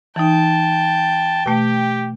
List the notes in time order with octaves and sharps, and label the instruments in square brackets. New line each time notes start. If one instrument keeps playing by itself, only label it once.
[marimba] E3 D#4 [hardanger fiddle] G5 [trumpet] A5
[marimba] B2 A3 [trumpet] G4